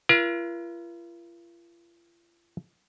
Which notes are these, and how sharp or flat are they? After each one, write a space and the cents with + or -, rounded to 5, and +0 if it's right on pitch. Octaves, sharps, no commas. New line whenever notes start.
F4 -45 A#4 +40